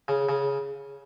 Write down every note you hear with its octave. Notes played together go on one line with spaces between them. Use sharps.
C#3
C#3